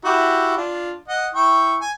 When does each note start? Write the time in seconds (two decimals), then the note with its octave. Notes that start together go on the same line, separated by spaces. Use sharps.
0.05 E4 F#4 G4
0.57 D4 F4
1.08 D#5 F#5
1.34 E4 G5 C#6
1.81 G#5